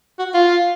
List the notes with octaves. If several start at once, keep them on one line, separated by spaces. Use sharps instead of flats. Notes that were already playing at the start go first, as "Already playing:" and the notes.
F#4
F4